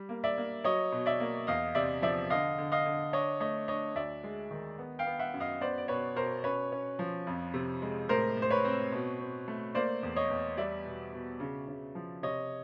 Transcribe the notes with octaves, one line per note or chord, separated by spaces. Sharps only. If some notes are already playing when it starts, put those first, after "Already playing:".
Already playing: G3
A#3
D5 E5
A#3
F#3 C#5 D#5
B2
D5 E5
A#3
E2 D#5 F5
C3 D5 E5
F3 D5 E5
D3 D#5 F5
D3
D#5 F5
D3
D4 C#5 D#5
A3 C#5 D#5
D4 C#5 D#5
D2 D5 E5
G#3
D#3
B3
F5 G5
B3
E5 F#5
F#2
D#5 F5
B3 C5 D5
D5
B2 B4 C#5
B2 A#4 C5
C#4 B4 C#5
C#4
F3
F2
C3
G#3
A2 A#4 C5
A2
C5
B4 C#5
C4
B2
C4
A3
A#3 C5 D5
E2
C#5 D#5
E2
G3 D5 E5
B2
B2
C#3
C#3
F3
C3 C#5 D#5